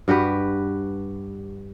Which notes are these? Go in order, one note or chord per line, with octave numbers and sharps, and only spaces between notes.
G2 F#4 G4 B4